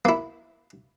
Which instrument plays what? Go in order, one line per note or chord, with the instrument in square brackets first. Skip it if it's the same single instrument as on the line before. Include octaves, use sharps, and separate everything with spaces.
[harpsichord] A#3 E4